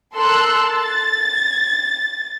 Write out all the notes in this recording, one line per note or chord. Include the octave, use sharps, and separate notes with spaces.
A4 A#4 C6 E6 F#6
A6